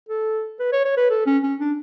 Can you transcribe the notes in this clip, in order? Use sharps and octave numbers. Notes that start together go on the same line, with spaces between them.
A4
B4
C#5
C#5
B4
A4
C#4
C#4
D4